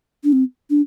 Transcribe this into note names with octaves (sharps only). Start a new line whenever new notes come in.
D4
C4
D4